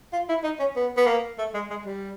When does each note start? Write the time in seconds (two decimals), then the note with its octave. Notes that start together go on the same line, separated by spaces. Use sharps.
0.13 F4
0.29 E4
0.44 D#4
0.59 C#4
0.76 B3
0.97 B3
1.07 A#3
1.38 A3
1.54 G#3
1.70 G#3
1.86 G3